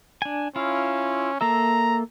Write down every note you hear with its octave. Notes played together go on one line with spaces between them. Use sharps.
D4 G#5
C#4 E4 F4 F5
A#3 A4 E5 A#5